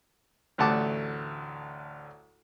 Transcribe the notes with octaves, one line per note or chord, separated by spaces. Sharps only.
A1 D2 A3 F#5 A5 D6